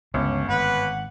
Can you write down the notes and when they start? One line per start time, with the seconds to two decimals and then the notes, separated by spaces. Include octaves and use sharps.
0.14 G1 C#2 C#4
0.49 G#1 B4 F#5